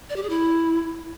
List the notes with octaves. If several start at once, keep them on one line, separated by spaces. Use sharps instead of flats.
D5
G4
G#4
E4